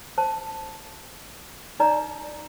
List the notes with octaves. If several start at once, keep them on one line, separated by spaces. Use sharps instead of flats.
C5 A5
D#4 C#5 D5 A#5